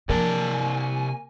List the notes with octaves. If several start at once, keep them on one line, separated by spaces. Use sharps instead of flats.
C3 F3 A#3 D5 G#5 A5